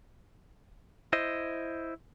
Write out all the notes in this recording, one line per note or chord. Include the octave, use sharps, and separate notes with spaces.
E4 C5 D#5